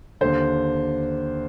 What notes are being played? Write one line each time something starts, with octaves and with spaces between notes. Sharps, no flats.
D#2 D3 C5